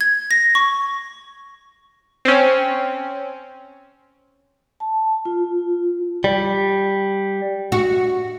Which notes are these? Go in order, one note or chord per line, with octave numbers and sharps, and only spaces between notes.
G#6
A#6
C#6
C4 C#4
A5
F4
G3
F#4